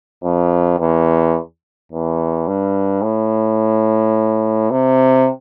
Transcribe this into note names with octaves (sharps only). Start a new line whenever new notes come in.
F2
E2
E2
G2
A2
C3